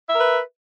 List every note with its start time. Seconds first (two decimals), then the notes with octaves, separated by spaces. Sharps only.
0.09 E5
0.14 A#4
0.19 B4